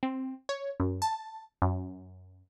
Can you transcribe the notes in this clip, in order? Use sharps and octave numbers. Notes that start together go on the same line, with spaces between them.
C4
C#5
F#2
A5
F#2